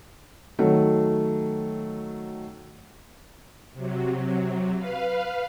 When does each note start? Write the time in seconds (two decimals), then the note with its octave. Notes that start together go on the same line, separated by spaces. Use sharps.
0.59 D#3 F#3 A3
3.73 C3 F#3
4.76 B4 F5